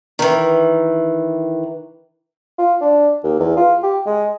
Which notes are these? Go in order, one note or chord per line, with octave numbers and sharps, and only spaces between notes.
D#3 E3
F4
D4
D#2
E2
F4
G4
G#3